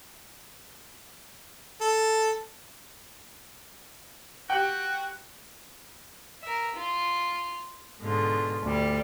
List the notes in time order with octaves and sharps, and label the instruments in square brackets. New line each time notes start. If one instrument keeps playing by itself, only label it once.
[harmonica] A4
[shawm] F#4 [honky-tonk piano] G4 G5
[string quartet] A#4 E5
F4
G#2 B2 D3 F4
D2 G3